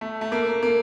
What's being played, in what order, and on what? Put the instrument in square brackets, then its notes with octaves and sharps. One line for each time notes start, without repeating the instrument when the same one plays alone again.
[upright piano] A3
A3
A#3
A#3